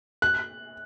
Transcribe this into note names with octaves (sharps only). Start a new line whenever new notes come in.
F#6